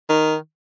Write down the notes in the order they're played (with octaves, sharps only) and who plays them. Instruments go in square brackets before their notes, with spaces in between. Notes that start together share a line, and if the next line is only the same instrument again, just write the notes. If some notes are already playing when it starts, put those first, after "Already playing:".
[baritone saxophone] D#3